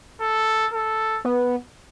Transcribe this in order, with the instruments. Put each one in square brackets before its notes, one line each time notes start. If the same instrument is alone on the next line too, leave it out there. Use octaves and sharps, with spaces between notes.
[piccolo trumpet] A4
A4
[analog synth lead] B3